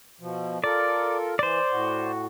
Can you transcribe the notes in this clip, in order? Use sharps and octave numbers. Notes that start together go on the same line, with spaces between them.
B2 F3
F4 A4 A#4 D5
E3 C5 D5
A2 F#4